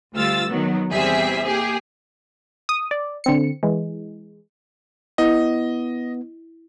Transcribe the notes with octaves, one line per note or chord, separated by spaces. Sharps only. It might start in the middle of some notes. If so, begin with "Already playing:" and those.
D2 G3 F4 E6 A6
D#3 F#3 B3
E2 C3 G3 C4 G#4 E5
A#3 G4 G#4
D#6
D5
D3 C4 C#7
E3 G#3
B3 E4 D#5